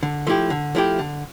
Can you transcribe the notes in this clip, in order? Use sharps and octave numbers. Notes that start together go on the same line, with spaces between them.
D3
F3 A3 E4 G4
D3
F3 A3 E4 G4
D3